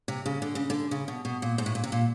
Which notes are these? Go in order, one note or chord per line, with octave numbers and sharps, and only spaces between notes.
C3
C#3
D3
C#3
D3
C#3
B2
B2
A#2
G#2
A2
A#2
C3
A#2